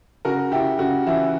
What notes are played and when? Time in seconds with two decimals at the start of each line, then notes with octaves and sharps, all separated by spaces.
0.25 C#3 F#4 A#4
0.52 C#3 E4 G4
0.79 C#3 F#4
1.06 E3 E4